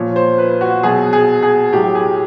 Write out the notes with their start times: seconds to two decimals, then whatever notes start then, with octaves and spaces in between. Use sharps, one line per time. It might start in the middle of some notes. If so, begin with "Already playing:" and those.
Already playing: A#2 F3 C#5
0.16 C5
0.38 B4
0.61 F#4
0.83 B2 F#3 G#4
1.13 G#4
1.43 G#4
1.73 A2 F#3 G4
1.95 G#4